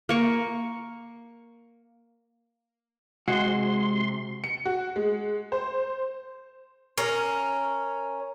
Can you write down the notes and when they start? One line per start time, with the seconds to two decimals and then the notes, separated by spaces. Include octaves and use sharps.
0.09 A#3 C#6
3.28 C3 G#3 F#4 C6
4.44 C#7
4.65 F#4
4.96 G#3
5.52 C5
6.98 C#4 A#4